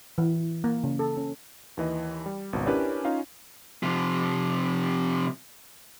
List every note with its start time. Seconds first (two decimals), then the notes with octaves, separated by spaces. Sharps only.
0.18 E3
0.64 A#3
0.83 C#3
0.99 A4
1.17 C#4
1.77 D#2 E3 D#5
2.26 G3
2.53 G#1 C#2 B2
2.66 C#4 D4 E4 G4 A#4 B4
3.05 C#4 D#4 F4 F5
3.83 C3 F3